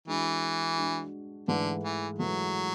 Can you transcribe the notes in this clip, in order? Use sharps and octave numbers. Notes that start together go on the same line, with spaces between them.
E3 G#3 D4 F#4
G#3 D4 F#4
G#2 D3 E3 A3 E4 B4
E3
G#2 E3 F#3 A3 E4 B4